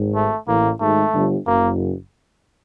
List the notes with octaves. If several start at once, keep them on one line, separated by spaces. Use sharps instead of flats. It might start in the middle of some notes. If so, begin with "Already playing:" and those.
Already playing: G#1 G#2
A3
A1 A2 A#3
G#1 G#2 A3
G1 G2
F#1 F#2 A#3